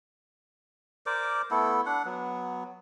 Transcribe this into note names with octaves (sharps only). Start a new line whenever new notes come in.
A#4 C5 D5 D6
A3 B3 E4 A4
D4 F#5
F#3 B3